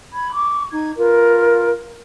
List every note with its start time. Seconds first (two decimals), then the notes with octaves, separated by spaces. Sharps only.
0.12 B5 G#6
0.32 C#6 D6
0.70 D#4 G#6
0.95 F4 A#4 B4